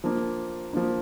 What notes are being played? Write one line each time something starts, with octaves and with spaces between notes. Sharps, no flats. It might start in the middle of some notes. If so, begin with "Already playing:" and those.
F3 A#3 D4
F3 A#3 D4